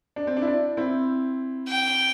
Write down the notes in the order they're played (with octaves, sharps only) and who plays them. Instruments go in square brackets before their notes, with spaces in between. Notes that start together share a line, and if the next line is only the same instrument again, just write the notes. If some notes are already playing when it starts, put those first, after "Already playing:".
[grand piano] D4
C4
D4
E4
D4
C4 E4
[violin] G5